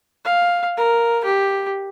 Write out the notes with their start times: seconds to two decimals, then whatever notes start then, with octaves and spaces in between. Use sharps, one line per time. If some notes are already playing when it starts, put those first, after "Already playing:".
0.25 F5
0.77 A#4
1.25 G4